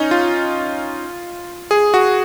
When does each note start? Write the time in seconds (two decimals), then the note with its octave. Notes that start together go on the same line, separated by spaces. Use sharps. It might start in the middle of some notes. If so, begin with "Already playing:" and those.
Already playing: C#4 D#4
0.11 F4
1.71 G#4
1.94 F#4